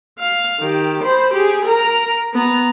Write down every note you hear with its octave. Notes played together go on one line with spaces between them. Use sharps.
F5
D#3 G4
C5 B5
G4 G#4
A#4 A#5
B3 A#5